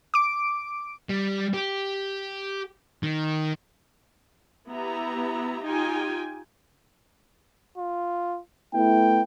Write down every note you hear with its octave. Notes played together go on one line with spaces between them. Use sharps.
D6 D7
G3
G4
D#3
B3 E4 G4 E5 A#5
D#4 F4 G4 G5 G#5
F4
A3 B3 E4 G5